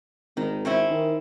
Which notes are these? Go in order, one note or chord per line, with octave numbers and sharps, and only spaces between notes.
G#1 D#3
C4 C#4 E4
D#3